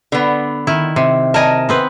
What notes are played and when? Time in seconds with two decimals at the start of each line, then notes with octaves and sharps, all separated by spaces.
0.12 D3 B3
0.67 D#3 E4
0.96 C3
1.34 A#4 D#5 G#5 A5
1.69 B3 C4 B4